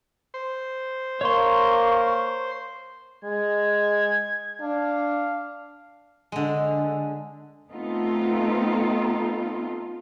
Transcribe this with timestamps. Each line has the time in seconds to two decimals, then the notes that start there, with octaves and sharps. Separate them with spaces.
0.34 C5
1.21 A#3 C#5 C6 C#6
3.24 G#3 G#6
4.61 D4 F5
6.32 D3 G#3
7.70 A3 B3 C4 D#4 F4 A4